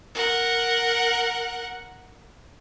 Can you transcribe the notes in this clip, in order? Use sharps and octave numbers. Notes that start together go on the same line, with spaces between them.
A#4 F#5